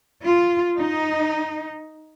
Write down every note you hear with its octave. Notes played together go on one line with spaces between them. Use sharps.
F4
D#4